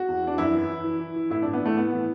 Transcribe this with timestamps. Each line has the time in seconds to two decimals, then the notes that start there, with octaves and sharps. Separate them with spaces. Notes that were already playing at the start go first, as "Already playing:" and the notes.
Already playing: F#4
0.08 E2
0.23 E3 D4
0.38 F#2 E4
0.53 E3
0.70 E3
0.84 E3
1.00 E3
1.16 E3
1.30 A2 E4
1.42 A2 D4
1.53 B3
1.61 E3 A3
1.77 A2 B3
1.93 E3